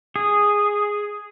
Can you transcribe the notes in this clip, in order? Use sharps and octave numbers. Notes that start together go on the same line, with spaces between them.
G#4